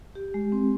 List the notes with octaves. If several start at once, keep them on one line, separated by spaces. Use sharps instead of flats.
G4
G#3
C4